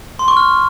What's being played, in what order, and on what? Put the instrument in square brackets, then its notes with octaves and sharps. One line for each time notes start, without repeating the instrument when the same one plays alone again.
[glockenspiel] C6
C#6
F6